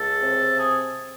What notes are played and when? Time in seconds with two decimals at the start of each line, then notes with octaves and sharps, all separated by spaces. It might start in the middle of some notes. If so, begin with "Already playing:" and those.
Already playing: C#2 A4
0.22 C3
0.56 G#4